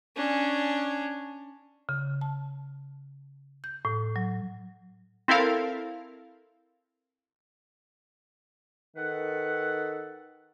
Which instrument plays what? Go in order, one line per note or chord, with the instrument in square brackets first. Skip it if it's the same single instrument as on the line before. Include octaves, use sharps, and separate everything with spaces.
[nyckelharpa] C#4 D4
[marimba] C#3
A5
G6
A2
F#3
[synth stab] C4 E4 A4 A#4 F5
[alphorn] D#3 [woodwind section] A4 B4 F#5